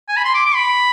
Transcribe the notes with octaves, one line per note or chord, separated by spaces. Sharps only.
G#5
B5
C6
D6
D6
B5